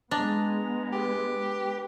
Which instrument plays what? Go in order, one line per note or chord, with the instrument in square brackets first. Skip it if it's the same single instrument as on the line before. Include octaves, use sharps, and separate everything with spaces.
[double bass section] G#3 B3 [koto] D4 [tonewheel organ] D#5 A#5
[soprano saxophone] G4 [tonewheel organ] B4